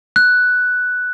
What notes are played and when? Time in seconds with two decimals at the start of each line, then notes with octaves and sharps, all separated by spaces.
0.16 F#6